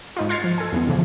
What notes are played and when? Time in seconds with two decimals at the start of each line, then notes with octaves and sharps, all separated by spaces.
0.17 G#2 D#4 F4
0.29 C6 F6 G#6 A6 C7 C#7
0.44 F3
0.58 A4 G#5
0.72 E2 E3 B3
0.87 D2 B2 D3 E3 F3